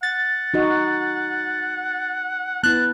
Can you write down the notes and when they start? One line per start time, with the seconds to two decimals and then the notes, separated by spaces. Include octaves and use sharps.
0.03 F#5 A6
0.54 D#4 F#4 D#5
2.63 B3 E4 A5 F#6